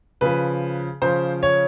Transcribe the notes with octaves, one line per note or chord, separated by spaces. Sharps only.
C#3 F3 B4
C#3 F3 C5
C#5